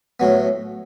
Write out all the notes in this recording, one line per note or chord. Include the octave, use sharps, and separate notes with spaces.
A2 F#3 B3